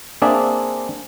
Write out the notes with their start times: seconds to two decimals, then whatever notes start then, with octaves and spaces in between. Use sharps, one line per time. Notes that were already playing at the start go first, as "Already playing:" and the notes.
0.22 A#3 C4 D4 G#4 D5 E5